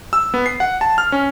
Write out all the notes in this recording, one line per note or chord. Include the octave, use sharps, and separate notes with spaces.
E6
B3
C7
F#5
A5
F6
C#4